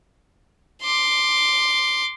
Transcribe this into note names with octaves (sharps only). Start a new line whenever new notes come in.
C6 D6